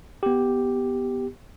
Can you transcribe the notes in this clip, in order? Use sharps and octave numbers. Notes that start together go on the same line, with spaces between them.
B3 G4